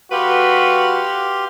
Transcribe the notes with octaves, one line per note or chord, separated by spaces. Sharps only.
G3 F#4 G4 A4 B4 F5 C6